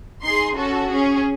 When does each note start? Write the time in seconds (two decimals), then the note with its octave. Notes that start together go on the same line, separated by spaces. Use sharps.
0.23 D#4 G#4 C6
0.57 C#4 F#4 A4
0.91 C#4 G#4